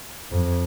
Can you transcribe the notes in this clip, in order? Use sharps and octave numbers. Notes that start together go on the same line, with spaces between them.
F2